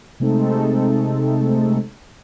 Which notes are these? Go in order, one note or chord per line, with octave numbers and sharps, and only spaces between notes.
C3 G#3 A3 C4 D#4 A4